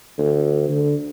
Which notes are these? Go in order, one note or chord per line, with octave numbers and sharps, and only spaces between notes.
D2
D3